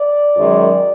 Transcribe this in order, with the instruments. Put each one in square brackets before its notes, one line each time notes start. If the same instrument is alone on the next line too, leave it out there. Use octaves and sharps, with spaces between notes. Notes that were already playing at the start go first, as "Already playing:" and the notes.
Already playing: [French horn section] D5
F#2 D#3 G#3